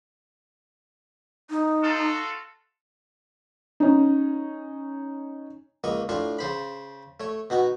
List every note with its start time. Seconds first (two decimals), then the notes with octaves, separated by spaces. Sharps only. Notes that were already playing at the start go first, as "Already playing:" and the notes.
1.50 D#4
1.82 F4 F#4 A4
3.80 C#4 D#4
5.84 C#2 A#3 D#5 C#6
6.09 A2 D4 F4 C#6
6.39 C#3 C5 B5
7.20 A3 C#5
7.50 B2 D#4 F#4 A#5